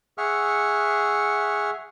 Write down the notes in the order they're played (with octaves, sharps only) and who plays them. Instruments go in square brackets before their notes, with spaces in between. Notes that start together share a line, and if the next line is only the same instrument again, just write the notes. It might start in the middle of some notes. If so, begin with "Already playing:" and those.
[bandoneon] G#4 E5 F#5 C#6 F6